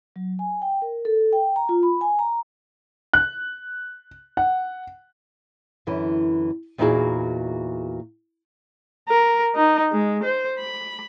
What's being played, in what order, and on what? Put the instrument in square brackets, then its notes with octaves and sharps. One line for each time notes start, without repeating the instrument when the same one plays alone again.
[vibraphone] F#3
G#5
G5
A#4
A4
G5
A#5
F4
B5
G#5
A#5
[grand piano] F#6
F#5
[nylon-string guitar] F#2 D3 E3 E4
E2 A#2 D#4 E4 F#4 G#4
[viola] A#4
D#4
G#3
C5
B5